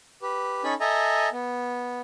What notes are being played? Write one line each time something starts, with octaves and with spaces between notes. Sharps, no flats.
G4 B4
C#4 D#4 A4 G#5 B5
A4 D#5 E5 G#5 A#5
B3